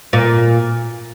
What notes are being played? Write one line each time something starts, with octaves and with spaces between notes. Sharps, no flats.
A#2